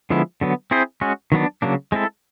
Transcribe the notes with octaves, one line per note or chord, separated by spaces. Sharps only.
D3 F3 G#3 B3 E4
D3 F#3 B3
C4 E4 G#4 C5
G#3 C#4 F#4
D#3 F#3 B3 D4
C#3 F#3 A#3 D4
G#3 C4 E4 A4